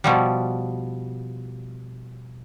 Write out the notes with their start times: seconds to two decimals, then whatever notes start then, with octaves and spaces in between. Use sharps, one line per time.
0.04 B2 F3 G3